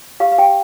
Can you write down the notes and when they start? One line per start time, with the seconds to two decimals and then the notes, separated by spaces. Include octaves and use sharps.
0.20 G4 F5
0.32 F5
0.38 G4 G5